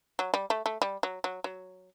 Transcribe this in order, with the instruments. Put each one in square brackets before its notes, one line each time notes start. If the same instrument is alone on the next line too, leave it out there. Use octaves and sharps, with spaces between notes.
[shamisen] F#3
G3
A3
A3
G3
F#3
F#3
F#3